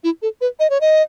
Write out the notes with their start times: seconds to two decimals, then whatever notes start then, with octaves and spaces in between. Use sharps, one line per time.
0.04 E4
0.22 A4
0.41 B4
0.59 D#5
0.70 C#5
0.81 D#5